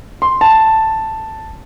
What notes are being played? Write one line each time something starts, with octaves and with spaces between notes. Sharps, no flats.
C6
A5